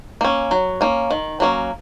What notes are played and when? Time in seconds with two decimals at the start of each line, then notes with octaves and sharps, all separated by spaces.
0.21 A#3 C#4
0.51 F#3
0.81 A#3 C#4
1.11 D#3
1.40 F#3 A#3 C#4